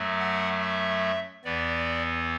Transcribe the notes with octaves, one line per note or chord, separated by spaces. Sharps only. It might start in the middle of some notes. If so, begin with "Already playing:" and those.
Already playing: F#2 F#3 A3
F#5
E5
E2 E3 B3 D5